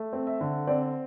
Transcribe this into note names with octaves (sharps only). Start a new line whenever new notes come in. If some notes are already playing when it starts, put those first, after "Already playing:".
Already playing: A3
C4
E5
D3
C4 D5